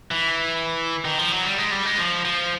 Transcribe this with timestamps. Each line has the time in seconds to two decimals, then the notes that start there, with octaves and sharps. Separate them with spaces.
0.11 E3
1.05 D#3
1.18 F3
1.32 F#3
1.45 G3
1.58 G#3
1.71 G3
1.85 G#3
1.98 F3
2.25 F3